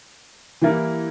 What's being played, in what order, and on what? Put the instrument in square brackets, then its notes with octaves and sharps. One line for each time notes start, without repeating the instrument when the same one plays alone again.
[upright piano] E3 G3 A#3 E4